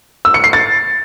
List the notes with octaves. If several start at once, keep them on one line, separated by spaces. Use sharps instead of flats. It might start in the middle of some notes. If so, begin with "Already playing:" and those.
E6
C#7
C7
A6